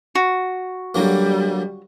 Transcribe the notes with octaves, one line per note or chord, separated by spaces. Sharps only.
F#4
D3 F#3 G3 A#3